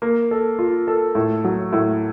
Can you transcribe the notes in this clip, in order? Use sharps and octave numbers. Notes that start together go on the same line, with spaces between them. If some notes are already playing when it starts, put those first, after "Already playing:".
A#3
A4
F4
A4
A2
F#3
A2